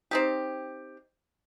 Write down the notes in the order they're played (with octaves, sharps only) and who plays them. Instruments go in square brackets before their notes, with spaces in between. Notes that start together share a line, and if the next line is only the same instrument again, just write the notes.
[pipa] C4 D#4 G4